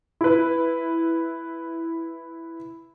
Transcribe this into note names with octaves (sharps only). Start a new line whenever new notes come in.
E4 B4